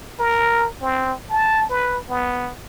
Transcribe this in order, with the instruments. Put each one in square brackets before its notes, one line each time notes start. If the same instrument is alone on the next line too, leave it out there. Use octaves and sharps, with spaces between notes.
[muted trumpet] A#4
C4
A5
B4
B3